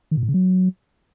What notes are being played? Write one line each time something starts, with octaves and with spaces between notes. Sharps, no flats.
D#3
A#2
A2
C#3
F#3